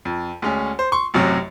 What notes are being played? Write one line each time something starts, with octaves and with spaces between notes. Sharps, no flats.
F2
D2 G#3 C#4
C5
C6 C#6
A1 F#2 C3 F#3